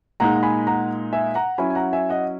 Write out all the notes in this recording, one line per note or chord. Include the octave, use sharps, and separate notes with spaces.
A#2 G#3 D#4 F#5 A#5
G#5 B5
F#5 A#5
E5 G#5
F#5 A#5
F#3 C#4 E4 G#5 B5
G#5
F#5 A#5
E5 G#5
D#5 F#5